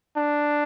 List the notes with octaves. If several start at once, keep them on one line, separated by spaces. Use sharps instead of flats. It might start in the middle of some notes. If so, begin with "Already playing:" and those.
D4